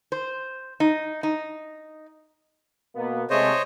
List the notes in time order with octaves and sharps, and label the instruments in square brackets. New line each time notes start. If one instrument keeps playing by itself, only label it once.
[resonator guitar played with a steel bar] C5
D#4
D#4
[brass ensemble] B2 A#3 B3
[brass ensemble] C3 G#3 A3 [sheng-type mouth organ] C5 C#5 D#5